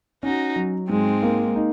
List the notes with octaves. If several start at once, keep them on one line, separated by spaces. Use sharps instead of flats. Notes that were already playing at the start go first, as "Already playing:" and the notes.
C#4 D#4 F#4
F#3
G#2 G#3 C4
A#3
D#4